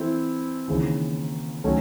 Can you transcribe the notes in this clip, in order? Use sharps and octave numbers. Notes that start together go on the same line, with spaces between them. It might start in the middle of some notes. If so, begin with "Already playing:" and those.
Already playing: E3 C4 E4 A4 C5
D#2 C#3 E3
D#3 F#3 A3 C#4